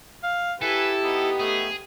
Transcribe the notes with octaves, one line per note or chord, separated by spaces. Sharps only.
F5
E4 G4 A4 B4 G#5
B3 D#4
A3 G#4